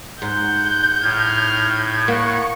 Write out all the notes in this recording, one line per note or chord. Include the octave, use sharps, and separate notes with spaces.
G#2 F#5 G6
A2 F6 G#6
A#3 F#5 C#6